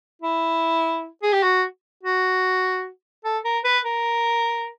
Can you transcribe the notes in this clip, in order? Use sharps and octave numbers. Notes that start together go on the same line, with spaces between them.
E4
G#4
G4
F#4
F#4
A4
A#4
B4
A#4